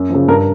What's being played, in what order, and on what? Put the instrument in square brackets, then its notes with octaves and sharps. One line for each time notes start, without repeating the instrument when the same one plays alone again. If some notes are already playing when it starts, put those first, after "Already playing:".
Already playing: [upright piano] F#2
C#3 F3
G2 A#4